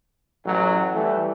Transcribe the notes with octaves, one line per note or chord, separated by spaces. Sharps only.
A1 F#3
E3 G3 A3